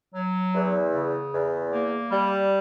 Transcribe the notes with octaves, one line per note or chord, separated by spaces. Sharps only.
F#3
E2
C#3
E2
A#3
G3